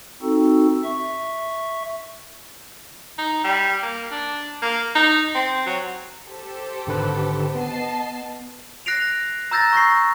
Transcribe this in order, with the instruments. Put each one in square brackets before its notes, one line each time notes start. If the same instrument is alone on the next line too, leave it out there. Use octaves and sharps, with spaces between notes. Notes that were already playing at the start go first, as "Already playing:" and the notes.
[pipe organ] C4 D#4 F#4 A4
E5 C#6
[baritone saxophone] D#4
G3
A#3
D4
A#3
D#4
C4
F#3
[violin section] G4 A4 C5
[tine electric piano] G#1 D3 B4
[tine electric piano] B3 [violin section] D#5 A5 C7
[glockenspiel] F#6 A#6 C7 D7 F7
A#5 E6 G6 A6 A#6
C#6 G6 A#6 C7